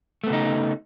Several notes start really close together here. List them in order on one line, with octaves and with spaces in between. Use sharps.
A3 B3 C#3 D#4